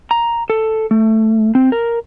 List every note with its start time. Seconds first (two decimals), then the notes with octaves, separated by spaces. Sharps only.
0.11 A#5
0.50 A4
0.91 A3
1.55 C4
1.72 A#4